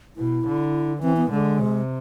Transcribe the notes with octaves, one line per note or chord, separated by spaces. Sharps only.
B2 E4
D3
E3 C4
B3
D3 G#3
C3